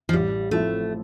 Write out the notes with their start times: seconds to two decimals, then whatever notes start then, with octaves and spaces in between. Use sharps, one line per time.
0.09 F3
0.13 A1 G3
0.51 A2 F3 A3 C4 E4